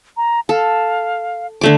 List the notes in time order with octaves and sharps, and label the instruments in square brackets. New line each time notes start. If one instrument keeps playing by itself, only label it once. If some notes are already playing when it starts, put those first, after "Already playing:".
[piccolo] A#5
[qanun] A4 [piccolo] F5
[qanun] D3 A3 D6